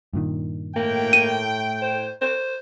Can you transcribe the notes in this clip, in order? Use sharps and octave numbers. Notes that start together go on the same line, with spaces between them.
G2 A#2 D#3
A2 A#3 G5
D#7
C5
C5